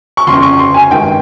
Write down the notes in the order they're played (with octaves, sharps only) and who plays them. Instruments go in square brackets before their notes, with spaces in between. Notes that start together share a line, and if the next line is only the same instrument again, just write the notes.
[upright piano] C#6
G1 F2 C#3 F3 C6
C#6
C6
G#5
G#1 G2 D#3 G5